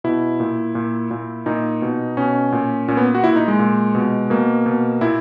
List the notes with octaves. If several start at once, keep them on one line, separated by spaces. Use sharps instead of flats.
B2 E4
A#2
A#2
A#2
A#2 D#4
B2
B2 C#4
A#2
A#2 C#4
B3
F#4
A#2 E4
D#4
G#3
A#2
B2
B2 A#3
B2
A#2 E4